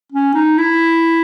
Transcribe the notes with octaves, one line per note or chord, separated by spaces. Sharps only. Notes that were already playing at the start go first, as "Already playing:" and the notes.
C#4
D#4
E4